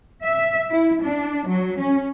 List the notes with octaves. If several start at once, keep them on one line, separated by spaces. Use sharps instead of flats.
E5
E4
D4
F#3
C#4